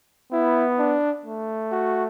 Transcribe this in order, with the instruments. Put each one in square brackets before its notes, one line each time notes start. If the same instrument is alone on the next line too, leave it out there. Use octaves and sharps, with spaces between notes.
[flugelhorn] B3 [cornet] E4
[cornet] D4
[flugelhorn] A3
[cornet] F#4